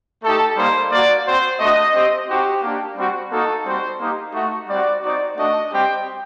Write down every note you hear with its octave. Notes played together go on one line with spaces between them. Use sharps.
A3 D#4 G4 A4
G3 A#3 D#4 C5
A#3 F#4 D5
C4 F#4 C5
A3 D4 F#4 D#5
C4 G4
C4 D#4 F#4 G4
A#3 D4 G4
G3 C4 F#4
A#3 D#4 F#4 A4
G3 C4 F#4 C5
A#3 D#4 G4
A3 D#4 F#4
G3 C4 F#4 D5
C4 D#4 F#4 D5
A3 D4 F#4 D#5
G3 C4 G4 G5